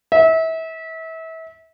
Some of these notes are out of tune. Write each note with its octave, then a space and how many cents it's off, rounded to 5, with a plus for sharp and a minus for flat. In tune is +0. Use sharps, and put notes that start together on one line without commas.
E5 -30